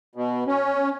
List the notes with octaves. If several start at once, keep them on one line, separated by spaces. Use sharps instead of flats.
B2
C#4